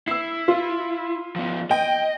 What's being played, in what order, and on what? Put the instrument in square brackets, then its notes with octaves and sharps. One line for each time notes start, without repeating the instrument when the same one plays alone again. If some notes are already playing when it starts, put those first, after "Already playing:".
[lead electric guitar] E4 [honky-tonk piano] E6 C7
[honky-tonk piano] F4
[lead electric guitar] F3 B3
[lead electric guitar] D#5 [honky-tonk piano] G5